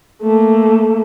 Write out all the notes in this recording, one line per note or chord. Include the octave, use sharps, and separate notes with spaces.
A3 A#3